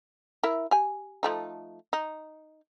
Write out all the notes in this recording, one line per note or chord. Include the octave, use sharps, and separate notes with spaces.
E4 A#4 E5
G4 G#5
F3 A3 D#4
D#4